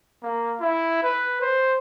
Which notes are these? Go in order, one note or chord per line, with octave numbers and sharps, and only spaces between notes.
A#3
E4
B4
C5